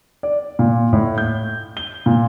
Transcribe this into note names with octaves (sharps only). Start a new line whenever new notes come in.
D5
A#2
A2
G6
G7
A#2